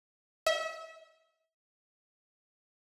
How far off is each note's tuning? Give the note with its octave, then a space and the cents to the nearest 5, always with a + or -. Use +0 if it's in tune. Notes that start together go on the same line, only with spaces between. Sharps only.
E5 -35